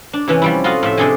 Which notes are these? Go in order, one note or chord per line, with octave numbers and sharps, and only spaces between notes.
D4
C3 E3 C#4
F3 G3 E4
F4 F#4 A4 D#5 F5
A2 F3 E5
C3 D4 G#4 A4 D#5 G#5